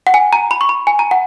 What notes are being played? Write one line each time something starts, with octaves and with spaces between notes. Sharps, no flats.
F#5
G#5
A#5
B5
C#6
B5
G#5
A#5
F#5